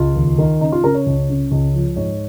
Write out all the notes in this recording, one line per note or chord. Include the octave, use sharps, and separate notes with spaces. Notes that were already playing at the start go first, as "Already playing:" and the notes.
Already playing: C#2 F4
D#2
D#3
C#3 D#4
F4
C#3 A#4
C#5
C#2
C#3
C#2
F3
G#2 C#5